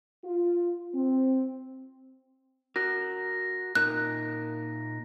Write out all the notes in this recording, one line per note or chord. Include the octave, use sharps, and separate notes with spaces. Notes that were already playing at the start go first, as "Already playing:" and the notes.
F4
C4
F#4 A#4 A#6
A#2 D#4 A#4 F#6